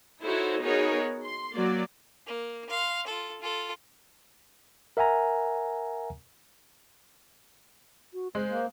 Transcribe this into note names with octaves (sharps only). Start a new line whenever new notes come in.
D#4 E4 F#4 A4 C5 C#5
B3 D#4 F#4 G#4 A#4 C#5
C6
F#3 A#3 D5
A#3
F5 C6
F4 A4
F4 A4
A#4 E5 F#5 G#5 A#5
F#4
G#3 C5
A#3